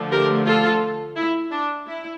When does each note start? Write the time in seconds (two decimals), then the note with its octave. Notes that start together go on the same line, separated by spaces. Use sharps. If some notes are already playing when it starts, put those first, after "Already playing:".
Already playing: D3 F3 A3
0.11 G4 A#4
0.46 F4 A4
1.16 E4
1.51 D4
1.87 E4